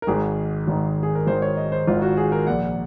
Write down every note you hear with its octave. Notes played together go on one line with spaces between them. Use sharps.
A#4
G#1 G#2 D#3 G#4
G#1 G#2 D#3
G#4
A#4
G#1 G#2 D#3 C5
C#5
D#5
C5
G#1 G#2 D#3 F4
F#4
G#4
A#4
A#1 A#2 F#5